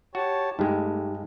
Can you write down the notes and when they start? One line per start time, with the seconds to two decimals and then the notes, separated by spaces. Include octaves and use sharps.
0.15 F#4 G4 C#5 A5
0.59 G2 G#3 A3 D#4 G4